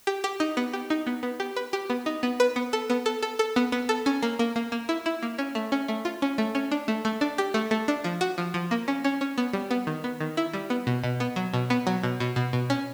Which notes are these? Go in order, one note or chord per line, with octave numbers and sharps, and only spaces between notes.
G4
G4
D#4
B3
G4
D#4
B3
B3
G4
B4
G4
B3
D#4
B3
B4
B3
A4
B3
A4
A4
A4
B3
B3
A4
C#4
A#3
A#3
A#3
A#3
E4
E4
A#3
C#4
A3
C#4
A3
F4
C#4
A3
C#4
D4
A3
A3
D4
G4
A3
A3
D4
F3
F#4
F3
F3
A#3
C#4
C#4
C#4
B3
G3
B3
D#3
B3
D#3
E4
G3
B3
B2
B2
B3
F#3
B2
B3
F#3
B2
B2
B2
B2
C#4